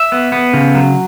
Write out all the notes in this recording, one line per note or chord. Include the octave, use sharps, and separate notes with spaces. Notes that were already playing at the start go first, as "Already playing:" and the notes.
Already playing: E5
B3
B3
C#3
F#3